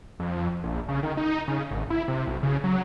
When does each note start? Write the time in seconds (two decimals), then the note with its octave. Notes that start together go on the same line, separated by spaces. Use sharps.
0.20 F2
0.64 A#1
0.89 C#3
1.03 D#3
1.17 D#4
1.48 C#3
1.71 G#1
1.90 E4
2.08 C3
2.27 B1
2.43 C#3
2.64 F#3